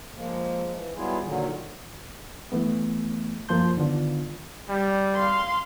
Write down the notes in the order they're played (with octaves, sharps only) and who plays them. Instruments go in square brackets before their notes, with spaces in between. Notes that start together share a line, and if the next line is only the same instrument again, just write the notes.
[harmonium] F3 G#3 A#3
E3
F#3 G3 B3 E4 F4 G#4
A#2 D3 D#3 F#3
[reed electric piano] E3 A3 B3
F#2 F3 A#3 A5 C6 G6
D3 D#3 B3 D4 F4
[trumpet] G3
[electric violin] F5 C6